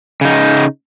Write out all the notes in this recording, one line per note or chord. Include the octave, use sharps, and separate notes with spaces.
C#3 D#4